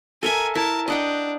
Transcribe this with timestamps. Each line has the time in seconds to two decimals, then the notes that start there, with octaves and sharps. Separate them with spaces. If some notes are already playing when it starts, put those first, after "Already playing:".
0.23 A4 A#4 E5 G#5
0.55 E4 A#4 A5
0.88 D4 D#5 F#5 G5